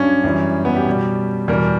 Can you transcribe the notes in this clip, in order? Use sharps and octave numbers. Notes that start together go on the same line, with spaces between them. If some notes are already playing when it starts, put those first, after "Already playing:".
Already playing: G2 F#3 C#4 D4
F#2 E3 G3
B3
G4
B2 G3
E2 B2 G3 A#4